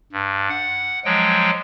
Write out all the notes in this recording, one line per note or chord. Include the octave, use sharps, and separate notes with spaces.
G2
F#5
F3 F#3 G#3 G5